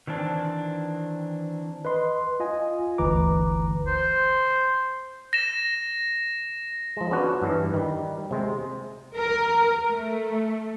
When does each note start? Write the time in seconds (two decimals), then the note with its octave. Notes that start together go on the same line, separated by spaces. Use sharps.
0.07 D#3 E3 C4 D4
1.85 B4 D#5 C6
2.40 F4 D#5 G#5
2.98 G1 D2 E3 B4 A#5 D6
3.87 C5
5.33 A#6 E7
6.97 F3 G#3
7.11 B3 C#4 D4 F#4
7.42 G2 E3
7.74 D#3 G3
8.31 C3 G#3
9.15 A#4
9.87 A3